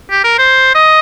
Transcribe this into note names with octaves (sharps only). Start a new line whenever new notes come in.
G4
A#4
C5
D#5